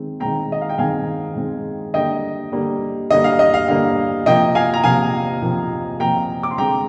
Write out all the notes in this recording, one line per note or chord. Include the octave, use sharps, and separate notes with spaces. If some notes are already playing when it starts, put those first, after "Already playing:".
Already playing: D#3 G#3 C4
D#3 G#3 C4 G5 A#5
D#5
F5
G5
D#3 G#3 C4 F5 G#5
D#3 G#3 C4
D3 G3 A#3 D#5 G5
D3 G3 A#3
D3 G3 A#3 D#5
F5
D#5
F5
D3 G3 A#3 F5
C3 F3 A#3 D#5 G5
F5 G#5
A#5
C3 F3 A#3 F5 G#5
C3 F3 A#3
C3 F3 A#3 G5 A#5
D6
C6
D3 G#3 C4 G5 A#5